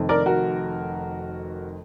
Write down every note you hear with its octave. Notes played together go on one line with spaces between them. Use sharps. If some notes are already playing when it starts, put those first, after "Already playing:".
Already playing: F1 F2 D#3
A#4 D5
F#4 A#4